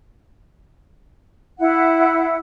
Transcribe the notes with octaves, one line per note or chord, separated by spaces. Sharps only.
E4 F#5